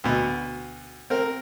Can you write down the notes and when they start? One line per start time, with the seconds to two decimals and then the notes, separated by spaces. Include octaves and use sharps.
0.04 D2 B2
1.10 C4 A#4